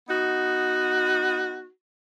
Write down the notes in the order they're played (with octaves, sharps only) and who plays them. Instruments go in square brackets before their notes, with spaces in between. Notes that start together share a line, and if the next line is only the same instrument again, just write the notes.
[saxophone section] B3 D#4 F#4